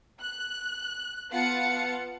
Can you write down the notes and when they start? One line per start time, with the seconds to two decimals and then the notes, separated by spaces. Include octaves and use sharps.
0.21 F#6
1.31 B3 F4 F5 F#5 A5 C#7